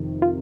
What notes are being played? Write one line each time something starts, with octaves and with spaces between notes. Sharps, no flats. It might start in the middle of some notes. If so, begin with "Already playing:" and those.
Already playing: F2 C3 D#3
F4